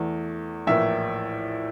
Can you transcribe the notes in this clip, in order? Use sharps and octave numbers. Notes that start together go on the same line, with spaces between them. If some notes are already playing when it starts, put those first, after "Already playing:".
Already playing: E2 E3 A3
A#1 A2 E3 A#3 E5